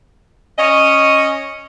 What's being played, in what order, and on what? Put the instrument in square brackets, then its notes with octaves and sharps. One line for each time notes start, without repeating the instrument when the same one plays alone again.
[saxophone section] C#4 C#5 D#5